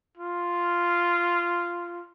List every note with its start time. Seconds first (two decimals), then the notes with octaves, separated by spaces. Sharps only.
0.17 F4